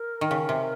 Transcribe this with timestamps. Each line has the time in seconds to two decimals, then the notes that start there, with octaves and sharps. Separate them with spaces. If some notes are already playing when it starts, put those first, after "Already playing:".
Already playing: A#4
0.21 D#3
0.31 C#3
0.49 C3